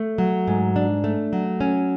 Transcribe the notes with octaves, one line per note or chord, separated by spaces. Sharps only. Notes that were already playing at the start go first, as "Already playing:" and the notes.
Already playing: A3
F#3
G#2
D4
A3
F#3
C#4